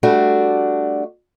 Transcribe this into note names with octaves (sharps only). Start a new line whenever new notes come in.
G3 A3 D4 F#4